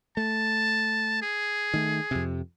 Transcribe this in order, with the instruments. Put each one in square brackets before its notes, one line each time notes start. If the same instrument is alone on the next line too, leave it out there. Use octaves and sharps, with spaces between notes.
[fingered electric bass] A3 [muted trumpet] A5
[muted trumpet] G#4
[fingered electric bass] D#3 A3
F2 C3